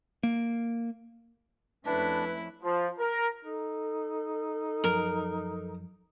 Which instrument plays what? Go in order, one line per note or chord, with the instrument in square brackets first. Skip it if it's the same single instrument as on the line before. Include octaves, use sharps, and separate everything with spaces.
[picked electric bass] A#3
[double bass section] F2 A3 C#4 [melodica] D4 [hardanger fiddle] E4 [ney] B4
[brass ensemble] F3
A#4
[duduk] D#4 [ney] A4
[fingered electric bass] F#2 F3 F#3 [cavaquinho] A#4